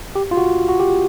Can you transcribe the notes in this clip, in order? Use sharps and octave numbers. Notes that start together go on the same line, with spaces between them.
G4
F4
F#4
F#4
G4